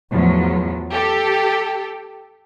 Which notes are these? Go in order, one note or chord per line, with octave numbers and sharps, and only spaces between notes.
E2 A2 F3 F#3
G4 A4